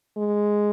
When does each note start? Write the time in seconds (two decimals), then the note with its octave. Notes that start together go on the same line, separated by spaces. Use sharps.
0.18 G#3